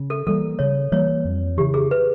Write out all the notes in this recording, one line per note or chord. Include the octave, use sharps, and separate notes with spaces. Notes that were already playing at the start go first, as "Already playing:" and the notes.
Already playing: C#3
A4
E3 G3 A#3 A4
C#3 C#5
E3 G3 A#3 C#5
F2
C#3 E3 G4
G#4
B4